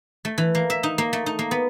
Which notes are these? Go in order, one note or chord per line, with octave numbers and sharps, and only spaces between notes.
A3
E3
A#3
E5
D#4
A#3
A3
D#4
A#3
B3